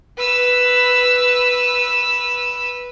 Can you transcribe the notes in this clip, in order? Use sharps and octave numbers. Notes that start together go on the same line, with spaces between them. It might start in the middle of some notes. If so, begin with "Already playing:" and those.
B4 E6